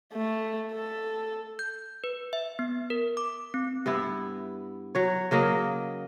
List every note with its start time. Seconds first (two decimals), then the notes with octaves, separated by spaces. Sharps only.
0.14 A3
0.73 A4
1.59 G6
2.04 B4
2.33 E5
2.59 B3
2.90 A#4
3.17 D6
3.54 C4
3.86 G2 B3 E4
4.95 F#3 C#5
5.31 C#3 F#3 A#3 D#5